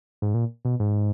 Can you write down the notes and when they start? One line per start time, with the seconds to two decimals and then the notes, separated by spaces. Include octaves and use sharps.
0.22 G#2
0.34 A#2
0.65 B2
0.80 G#2